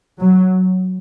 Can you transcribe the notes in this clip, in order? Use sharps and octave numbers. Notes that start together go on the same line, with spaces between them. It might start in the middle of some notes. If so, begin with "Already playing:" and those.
F#3